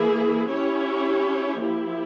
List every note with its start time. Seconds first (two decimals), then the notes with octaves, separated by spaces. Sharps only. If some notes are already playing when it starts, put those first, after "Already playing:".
Already playing: E3 A#3 E4 G#4
0.48 C#4 E4 G4 C#5
1.61 F3 A#3 E4 G4